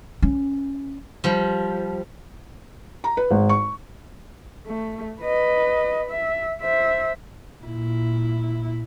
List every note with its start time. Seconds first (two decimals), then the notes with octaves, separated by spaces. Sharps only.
0.22 C#4
1.24 F3 G3
3.04 A#5
3.17 B4
3.31 G#1
3.49 C#6
4.67 A3
5.21 B4 D#5
6.11 E5
6.62 C5 E5
7.64 A#2 E4